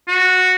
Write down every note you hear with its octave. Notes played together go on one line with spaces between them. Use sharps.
F#4